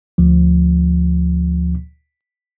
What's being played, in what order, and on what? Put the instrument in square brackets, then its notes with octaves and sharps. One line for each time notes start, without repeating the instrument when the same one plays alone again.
[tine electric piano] D2 F3